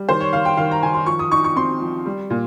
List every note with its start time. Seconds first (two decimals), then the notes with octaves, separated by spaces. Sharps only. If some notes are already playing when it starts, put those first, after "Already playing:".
Already playing: G3
0.09 D#3 C5
0.21 C#5
0.33 D#3 F5
0.45 G5
0.57 D#3 F5
0.71 A#5
0.83 D#3 G#5
0.94 C6
1.06 F3 C#6
1.19 D#6
1.32 D#4 C#6
1.44 C#6
1.56 C4 C6
1.81 F3
2.06 G3
2.30 A#2